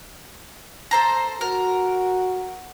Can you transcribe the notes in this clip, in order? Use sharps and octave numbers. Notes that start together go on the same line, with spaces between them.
A4 C5 A#5
F#4 A#4